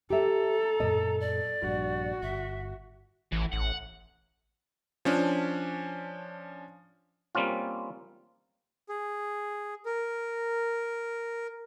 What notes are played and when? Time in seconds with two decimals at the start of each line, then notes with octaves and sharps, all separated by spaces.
0.10 G4 A4 E5 A#5
0.80 F#2 A#2 A#3 D#5
1.20 D5
1.63 A#1 G2 F#4
2.23 G1 E5
3.32 A1 E3
3.53 A1 F#5
5.05 F3 C#4 D4
7.35 G3 A#3 C4 C#4 F4
8.89 G#4
9.86 A#4